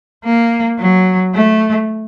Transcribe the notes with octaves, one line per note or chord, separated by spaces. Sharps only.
A#3
F#3
A3